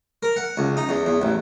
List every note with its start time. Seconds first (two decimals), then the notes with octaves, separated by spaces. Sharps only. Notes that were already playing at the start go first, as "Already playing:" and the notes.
0.23 A#4
0.37 F#5
0.57 C#2
0.77 D#4
0.89 E2
1.06 E2
1.22 A1